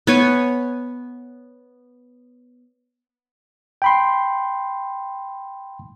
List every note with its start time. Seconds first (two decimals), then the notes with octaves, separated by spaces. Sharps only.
0.07 B3 C#5 G#5
3.82 G5 B5 C6